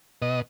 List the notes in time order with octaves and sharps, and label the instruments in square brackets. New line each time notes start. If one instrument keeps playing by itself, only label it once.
[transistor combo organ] B2 D#5